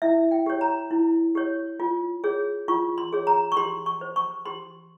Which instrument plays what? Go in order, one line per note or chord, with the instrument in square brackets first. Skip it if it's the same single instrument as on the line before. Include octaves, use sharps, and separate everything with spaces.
[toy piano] E4 E5
G5
G4 C#5
A#5
E4
G4 C#5
F4
G#4 C#5
F4 C#6
C6
G#4 C#5
A#5
C#6
G4 C6
C#6
C5
C#6
G4 C6